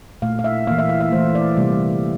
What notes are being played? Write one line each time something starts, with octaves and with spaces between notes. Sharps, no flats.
A#2 A3 F5
F5
E5
E3 A#3 F5
E5
F5
E5
E3 A3 C5
D5
C3 G3 A#3